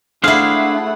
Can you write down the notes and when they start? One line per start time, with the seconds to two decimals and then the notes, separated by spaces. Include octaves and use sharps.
0.24 A3 D4 E4 G#4 C5 F5 F#5